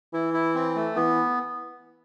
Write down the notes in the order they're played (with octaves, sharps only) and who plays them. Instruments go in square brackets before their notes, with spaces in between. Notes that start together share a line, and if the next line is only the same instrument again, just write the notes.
[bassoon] E3 [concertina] E4
[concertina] E4
C4
A3
[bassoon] E3 [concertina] B3